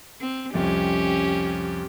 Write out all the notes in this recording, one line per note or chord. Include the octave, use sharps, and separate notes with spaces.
C4
C2 F2 C#4 G4